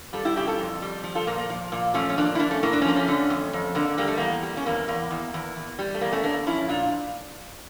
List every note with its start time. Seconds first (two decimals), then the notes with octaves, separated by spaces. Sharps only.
0.13 G3 F4 A4
0.25 E4 G4
0.36 C#3 E4 G4
0.47 F4 A4
0.59 F2
0.82 G3
1.04 F3
1.15 F4 A4
1.27 A#2 A#3
1.38 A#3
1.50 F3
1.72 A#2 A#3
1.94 F3 A3 C#4
2.09 C#4
2.17 F3 A#3 D4
2.35 E4
2.39 F3 A#3 D4
2.51 A3 C#4
2.63 A2 A#3
2.73 D4
2.82 C#4
2.85 F3 A#3
2.96 A3 C#4
3.08 D3
3.30 F2
3.53 F2
3.75 D3 A#3
3.98 G3 A#3
4.07 A3
4.18 E2 A#3
4.43 G3
4.57 C#4
4.66 E2 A#3
4.88 E2 A#3
5.11 E2
5.34 E2
5.56 E2
5.79 G3
5.94 A3
6.01 E2 A#3
6.12 A3 C#4
6.24 E2 A#3 D4
6.46 F3 C#4 E4
6.69 A#2 D4 F4